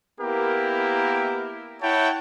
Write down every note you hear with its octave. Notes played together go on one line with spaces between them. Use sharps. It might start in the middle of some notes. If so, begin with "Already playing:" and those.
A#3 B3 E4 G4 A#4
E4 C#5 F#5 G5 A5